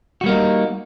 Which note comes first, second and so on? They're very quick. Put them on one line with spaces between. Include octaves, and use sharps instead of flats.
F#4 G3 A#3 D#4